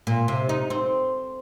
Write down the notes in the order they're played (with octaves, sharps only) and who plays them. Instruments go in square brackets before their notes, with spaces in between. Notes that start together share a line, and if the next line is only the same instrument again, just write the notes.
[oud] A#2
C3
D#4
C4